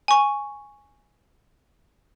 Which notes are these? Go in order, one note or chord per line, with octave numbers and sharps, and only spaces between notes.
G#5 C#6